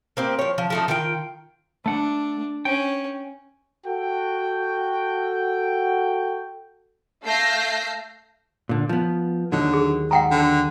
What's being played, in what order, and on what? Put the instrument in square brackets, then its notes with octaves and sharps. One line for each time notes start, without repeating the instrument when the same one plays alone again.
[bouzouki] A#3 C4 G4
F3 C#5
F3
F3 A3 D#4
D#3 F4 G5
[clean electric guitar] A3 F#5 [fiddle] D4
[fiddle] C#4 [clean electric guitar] G5
[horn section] F#4 A4 G5
[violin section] A3 F5 E6 G6 A#6 C7
[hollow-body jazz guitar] A#2 D3
F3 B3
[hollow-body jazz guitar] D#2 D#3 F#3 [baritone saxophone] D3
[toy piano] G#4
[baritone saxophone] G#2 [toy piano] F#5 G5 A#5
[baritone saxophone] D3